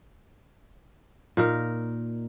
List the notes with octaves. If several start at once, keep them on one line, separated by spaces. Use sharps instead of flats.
A#2 D#4 A#4